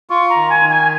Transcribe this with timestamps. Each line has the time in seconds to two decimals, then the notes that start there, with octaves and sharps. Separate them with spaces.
0.10 F4 C#6
0.30 A#5
0.36 D#3
0.50 G#5
0.63 D#3
0.70 G#5